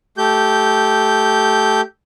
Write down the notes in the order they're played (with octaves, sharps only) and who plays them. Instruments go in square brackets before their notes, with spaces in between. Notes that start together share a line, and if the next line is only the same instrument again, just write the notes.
[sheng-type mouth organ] A3 G4 G6